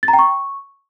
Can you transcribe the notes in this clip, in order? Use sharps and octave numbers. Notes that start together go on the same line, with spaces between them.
A6
A#5
G5
C#6